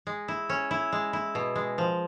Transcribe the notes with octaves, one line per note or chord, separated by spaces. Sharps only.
G#3
E4
C#4
E4
G#3
E4
B2
G#3
F3